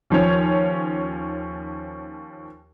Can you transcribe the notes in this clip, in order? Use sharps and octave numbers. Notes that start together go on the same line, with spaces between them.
D#2 F3 C#4 C#5